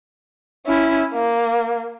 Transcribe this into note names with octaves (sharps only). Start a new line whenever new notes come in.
C#4 E4
A#3